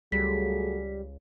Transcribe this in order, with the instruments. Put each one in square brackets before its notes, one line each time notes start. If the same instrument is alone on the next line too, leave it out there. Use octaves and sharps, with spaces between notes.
[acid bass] C#2 [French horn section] F#3 A3 G#4 [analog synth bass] G3 [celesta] B6